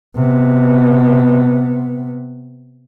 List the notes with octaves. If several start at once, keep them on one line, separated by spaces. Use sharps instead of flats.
C3 B3